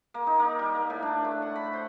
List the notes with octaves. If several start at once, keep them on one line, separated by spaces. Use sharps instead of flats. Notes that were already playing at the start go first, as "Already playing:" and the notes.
A#3
D#4
A#3
G3
A#3
A2
D4
A3
F#5
B5
C5